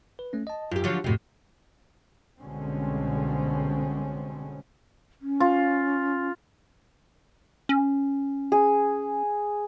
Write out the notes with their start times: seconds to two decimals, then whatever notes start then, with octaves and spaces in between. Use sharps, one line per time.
0.19 B4
0.33 A3 C#4
0.47 D#5 A5
0.71 F#2 F4 G4
0.84 D3 F3 F#3
1.04 F2 A2 C3 F#4
2.40 C2 B2 D3 G#3 C4 C#4
5.22 C#4
5.40 F4
7.69 C#4
8.52 G#4